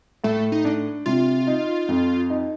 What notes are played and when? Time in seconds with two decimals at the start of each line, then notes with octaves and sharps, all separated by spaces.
0.24 A2 A3
0.52 D#4
0.65 D4
1.06 C3 F4
1.47 D#4
1.89 F2
2.30 D#4